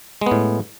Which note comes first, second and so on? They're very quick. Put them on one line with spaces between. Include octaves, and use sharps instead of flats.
G#3 B3 A2